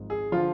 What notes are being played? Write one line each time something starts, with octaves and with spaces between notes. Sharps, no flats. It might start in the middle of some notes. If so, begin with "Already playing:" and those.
Already playing: G#1 G#2 F3
G#4
D3 F3 F4